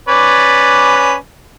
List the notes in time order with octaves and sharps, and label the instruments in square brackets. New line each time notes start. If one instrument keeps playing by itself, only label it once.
[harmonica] C#4 B4 D5